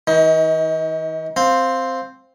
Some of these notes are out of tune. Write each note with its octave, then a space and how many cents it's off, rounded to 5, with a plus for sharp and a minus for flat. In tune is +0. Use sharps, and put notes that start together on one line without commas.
E3 -45 D#4 +30
C4 +0 F5 +5